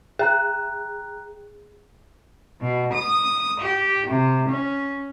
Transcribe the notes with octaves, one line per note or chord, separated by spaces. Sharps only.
G#4 G5 A#5 F#6
B2
D#6
G4
C3
C#4